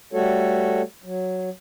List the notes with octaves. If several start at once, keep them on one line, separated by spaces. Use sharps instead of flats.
G3 A3 F#4 A4 C#5
F#3